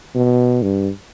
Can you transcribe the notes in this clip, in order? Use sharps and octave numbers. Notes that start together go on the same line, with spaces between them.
B2
G2